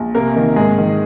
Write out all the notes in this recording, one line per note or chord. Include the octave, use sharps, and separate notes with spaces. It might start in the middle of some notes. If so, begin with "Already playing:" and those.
Already playing: A#1
C3 A#3 A#4
D#3
G#2 G#3 G#4
D#3